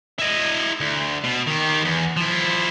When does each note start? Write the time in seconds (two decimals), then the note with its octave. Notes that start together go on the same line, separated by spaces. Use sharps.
0.19 E4 D#5
0.81 D2
1.24 B2
1.47 D#3 G4
1.85 E2
2.17 F3 E4